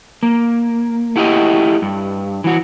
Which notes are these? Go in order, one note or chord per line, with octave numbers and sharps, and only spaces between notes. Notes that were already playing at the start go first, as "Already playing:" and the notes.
A#3
A3 E4 F#4 G4 D#5
G2
E3 F#4